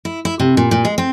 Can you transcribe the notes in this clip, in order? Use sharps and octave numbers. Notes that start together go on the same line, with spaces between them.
E4
E4
C3
A#2
A#2
G#3
C4